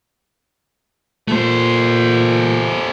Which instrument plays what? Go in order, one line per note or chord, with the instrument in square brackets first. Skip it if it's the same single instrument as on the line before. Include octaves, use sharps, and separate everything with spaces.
[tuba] A#2 [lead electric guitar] A3 C5